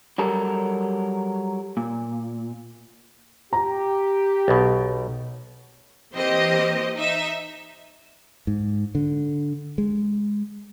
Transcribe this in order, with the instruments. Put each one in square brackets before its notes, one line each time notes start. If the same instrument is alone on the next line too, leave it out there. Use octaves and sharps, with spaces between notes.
[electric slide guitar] F#3 G3 A4 A#4
A#2
[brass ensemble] G4 [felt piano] A#5
[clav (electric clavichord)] B1 B2
[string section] E3 A#3 C4 G4 C5 D#5
D#4 E5
[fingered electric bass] G#2
D3
G#3